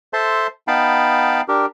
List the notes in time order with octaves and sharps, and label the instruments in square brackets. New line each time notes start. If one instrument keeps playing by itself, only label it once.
[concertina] A4 C5 E5 A5 C6
B3 D#4 F5 G5 A5 B5
D4 G4 A#4